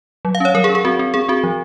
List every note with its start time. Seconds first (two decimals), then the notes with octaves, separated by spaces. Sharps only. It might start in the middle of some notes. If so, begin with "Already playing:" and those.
0.25 F#3
0.35 F5
0.40 C#4 C#5
0.54 F#3 A#4
0.64 G#4
0.69 C#4
0.75 G#4
0.85 C4 F#4
0.99 C4
1.14 C4 G#4
1.28 C4 F#4
1.44 F3